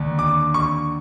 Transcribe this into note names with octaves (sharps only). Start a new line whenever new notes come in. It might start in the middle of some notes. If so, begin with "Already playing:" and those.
Already playing: D#2 D3
D6
C#6